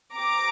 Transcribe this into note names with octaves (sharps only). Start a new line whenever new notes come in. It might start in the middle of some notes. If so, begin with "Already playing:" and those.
C4 G4 A#5 D6